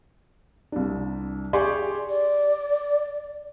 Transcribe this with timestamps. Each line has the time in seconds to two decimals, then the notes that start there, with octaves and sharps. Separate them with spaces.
0.72 C2 D4
1.53 G4 G#4 D5 G#5 C6 C#6
2.09 D5